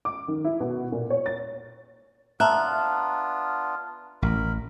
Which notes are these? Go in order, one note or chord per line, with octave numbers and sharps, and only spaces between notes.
D6
D#3
E4
B2
A#2
C#5
A6
B3 D4 F4 E5 A5 A#5 F#6
A1 A#4 B5